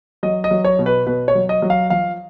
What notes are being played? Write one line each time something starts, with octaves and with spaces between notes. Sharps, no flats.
F#3 D#5
D#5
F#3
C#5
B2
B4
B2 B4
C#5
F#3
D#5
F#3
F5
F3 F5